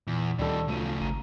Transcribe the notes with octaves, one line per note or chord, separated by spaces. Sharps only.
E2 A#2
D2 D#3 G3 D4 A4
B1 C#3 F3 A3 D#7
G#1 A#5 D#7